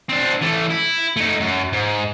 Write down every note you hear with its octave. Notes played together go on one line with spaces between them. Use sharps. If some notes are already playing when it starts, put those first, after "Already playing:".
C4 D4
E3 A3
E4
A3 D#4
F#2
G#2